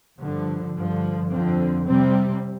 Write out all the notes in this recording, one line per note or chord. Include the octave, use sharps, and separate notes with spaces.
G2 D3 F3
G2 D3 F3
F2 D3 F3 C4
C3 G3 C4